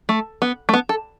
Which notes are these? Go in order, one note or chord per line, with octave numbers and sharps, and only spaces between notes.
A3
B3
A3
B3
A4